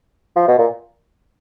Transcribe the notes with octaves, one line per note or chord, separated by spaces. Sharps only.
F3
B2
A#2